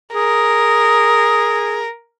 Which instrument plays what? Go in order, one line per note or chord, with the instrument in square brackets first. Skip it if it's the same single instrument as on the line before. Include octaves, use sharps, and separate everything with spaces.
[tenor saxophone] G#4 [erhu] A#4